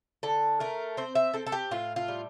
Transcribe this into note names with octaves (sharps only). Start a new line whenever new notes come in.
D3 A4
A3 A#4
C4 C5
E5
C4 A4
A4
G4
A2 F4
F4
G3